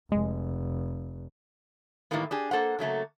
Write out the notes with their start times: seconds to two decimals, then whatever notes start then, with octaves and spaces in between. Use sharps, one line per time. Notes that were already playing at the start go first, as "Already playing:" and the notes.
0.12 F1 G#3
2.11 A2 D#3 E3 G3 A#3 B3
2.31 D4 G4 G#4
2.51 A#3 A4 C5 F#5
2.79 C#3 F#3 A3 A#3